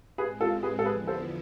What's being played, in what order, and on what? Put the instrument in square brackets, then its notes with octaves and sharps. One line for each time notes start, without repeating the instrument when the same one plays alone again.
[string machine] A2 G#3 C4 [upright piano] G#4 B4
[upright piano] F4 A4
G#4 B4
A4
[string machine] E2 D3 F3 B3 E4 [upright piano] G#4 B4
[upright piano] A4 C5